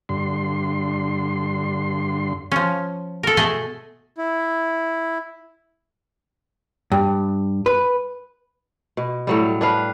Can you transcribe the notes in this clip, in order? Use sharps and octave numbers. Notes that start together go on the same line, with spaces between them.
G2 D3 C6
F3 C#4
A4 A#4
B2 A3 G#4 D#5 E5 A5
E4
G2
B4
B2
A2 F#3 G3
D4 B4 F5